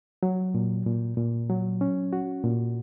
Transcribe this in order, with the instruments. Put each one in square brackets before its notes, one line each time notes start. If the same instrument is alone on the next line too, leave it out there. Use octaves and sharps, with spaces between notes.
[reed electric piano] F#3
A#2
A#2
A#2
F#3
C#4
F#4
A#2